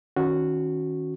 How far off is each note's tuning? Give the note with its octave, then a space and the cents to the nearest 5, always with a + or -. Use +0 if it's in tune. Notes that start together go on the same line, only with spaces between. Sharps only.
D#3 +0 C#4 +0 F#4 -5